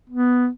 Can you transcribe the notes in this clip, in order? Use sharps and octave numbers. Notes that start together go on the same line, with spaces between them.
B3